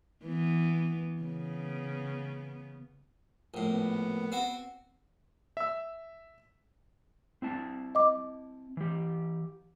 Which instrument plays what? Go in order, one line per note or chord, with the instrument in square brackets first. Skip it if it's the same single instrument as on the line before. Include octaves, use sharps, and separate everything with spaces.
[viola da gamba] E3 B3
C#3 B3
[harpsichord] A#1 A2
[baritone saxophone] B3
[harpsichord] C4 F#4
[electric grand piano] E5 E6
[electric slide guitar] C4 E4 A5
[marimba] D#5 D6
[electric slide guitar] E3 G4